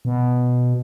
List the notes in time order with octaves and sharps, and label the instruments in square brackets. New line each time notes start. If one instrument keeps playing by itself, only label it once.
[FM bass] B2